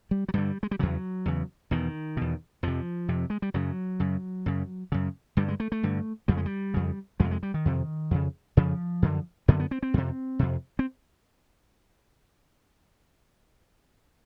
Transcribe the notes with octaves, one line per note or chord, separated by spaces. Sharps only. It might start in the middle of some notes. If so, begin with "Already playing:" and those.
G3
F#3
G2 D3 G3
G#3
G3
E2 C#3 F#3
E2 C#3
E2 B2 D#3
E2 B2
F2 C3 F3
F2 C3
G#3
G3
F#2 C#3 F#3
F#2 C#3
F#2 C#3
F#2 C#3
G2 D3 G3
G#3
A3
A3
G2 D3
F2 C#3 G3
G#3
G3
F2 C#3
F2 C3 G#3
G#3
G3
D#3
F2 C3
F2 C#3
F2 C#3 F3
F#2 D3
F#2 D3 B3
B3
C4
C4
F2 C3
F2 C3
C4